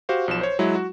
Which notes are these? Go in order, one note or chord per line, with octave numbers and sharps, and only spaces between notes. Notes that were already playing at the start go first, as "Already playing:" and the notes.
F#4 G4 C5 F5
B1 F3 E7
C5 C#5
F#3 G#3 E4
F#4